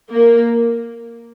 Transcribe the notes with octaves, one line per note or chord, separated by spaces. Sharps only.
A#3